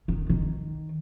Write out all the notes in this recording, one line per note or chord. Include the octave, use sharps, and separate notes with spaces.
D#3
D#3